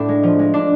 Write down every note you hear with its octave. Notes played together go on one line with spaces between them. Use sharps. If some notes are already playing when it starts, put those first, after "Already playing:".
Already playing: A2 D4
G#3
F3
G#3
D4